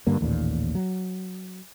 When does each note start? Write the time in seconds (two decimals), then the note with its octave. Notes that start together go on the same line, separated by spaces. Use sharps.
0.07 G2 D3 A#3
0.21 A1 D#2 A#2
0.75 F#3